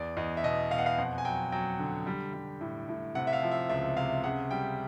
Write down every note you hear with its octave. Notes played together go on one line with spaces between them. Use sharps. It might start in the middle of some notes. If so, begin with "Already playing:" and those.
Already playing: E2 D5
E2 D#5
E5
B2 D#5
B2 F5
F#5
F5
F2 F#5
G#5
F#3 G5
F#3 G5
D3
G3
G3
A2
A2
C3 F#5
E5
F5
F3
E5
C#2 E5
C3 F5
C#3 F#5
G3 G5